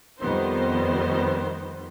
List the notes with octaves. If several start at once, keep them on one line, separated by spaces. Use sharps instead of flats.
F2 D#3 G3 B3 C5